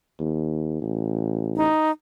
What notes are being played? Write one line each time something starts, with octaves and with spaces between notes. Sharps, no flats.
D#2
A1
D#4